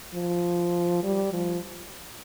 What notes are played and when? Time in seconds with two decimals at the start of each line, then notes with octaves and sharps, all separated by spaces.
0.14 F3
1.03 G3
1.33 F3